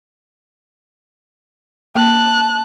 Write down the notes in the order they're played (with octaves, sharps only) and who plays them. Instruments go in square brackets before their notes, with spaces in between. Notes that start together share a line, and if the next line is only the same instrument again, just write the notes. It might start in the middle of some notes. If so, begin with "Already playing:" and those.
[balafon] A#3 [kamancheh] A5 F#6